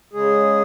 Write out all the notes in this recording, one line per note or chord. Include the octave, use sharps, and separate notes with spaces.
C#3 G#3 G#4